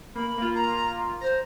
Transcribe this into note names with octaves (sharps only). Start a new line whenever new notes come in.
A#3 B5
A#3 F4
A#5
C5 A#5